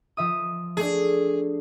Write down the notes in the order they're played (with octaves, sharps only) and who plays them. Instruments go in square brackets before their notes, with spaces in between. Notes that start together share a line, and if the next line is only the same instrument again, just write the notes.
[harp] F3 E5 D#6
[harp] A3 D4 [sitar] G#4